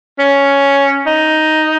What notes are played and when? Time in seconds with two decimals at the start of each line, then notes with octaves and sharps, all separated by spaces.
0.19 C#4
1.06 D#4